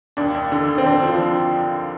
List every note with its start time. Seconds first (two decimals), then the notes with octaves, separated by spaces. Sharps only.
0.17 D#2 D4
0.35 D#2
0.52 D3
0.69 D#2
0.78 C4
0.85 D3 D4
1.03 F3